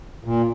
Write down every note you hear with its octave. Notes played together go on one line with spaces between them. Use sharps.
A#2